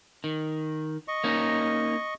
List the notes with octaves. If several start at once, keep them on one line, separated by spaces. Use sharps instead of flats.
D#3
D#5 C#6
A#3 C#4 D#4